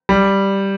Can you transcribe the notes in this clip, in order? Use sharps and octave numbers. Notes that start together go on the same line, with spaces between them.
G3